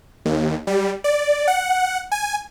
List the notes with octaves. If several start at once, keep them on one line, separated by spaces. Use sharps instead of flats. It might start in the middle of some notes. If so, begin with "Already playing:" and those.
D#2
G3
D5
F#5
G#5